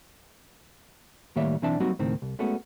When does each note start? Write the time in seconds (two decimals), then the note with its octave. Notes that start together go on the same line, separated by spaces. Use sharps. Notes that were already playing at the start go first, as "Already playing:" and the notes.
1.36 A2 D#3 G3 A#3 C#5 E5
1.62 B1 E3 C4 D4 E5 A5
1.80 F#3 G3 A#3 C4 D#4 F#4
1.99 C#2 A2 D#3 C4
2.22 C2
2.39 G#3 A3 B3 C#4 F#4